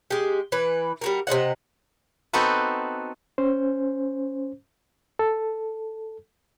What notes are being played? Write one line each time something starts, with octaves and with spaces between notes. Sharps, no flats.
G#3 G4
E3 B4
G3 F#4 A#4
C3 G3 D#5 F#5
B3 C4 D#4 F#4 A4 B4
C#4 C5
A4